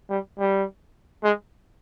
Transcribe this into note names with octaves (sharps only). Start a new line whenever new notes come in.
G3
G3
G#3